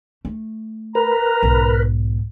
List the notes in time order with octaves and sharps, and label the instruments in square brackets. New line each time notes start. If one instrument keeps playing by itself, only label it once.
[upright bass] A3
[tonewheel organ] A#4 B4 [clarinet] A#5
[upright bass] B1 G#2